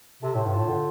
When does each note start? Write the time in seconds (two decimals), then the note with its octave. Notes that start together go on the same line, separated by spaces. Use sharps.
0.22 C3 A4
0.35 A2 C5
0.46 G2
0.53 A2 F4
0.69 D3 C5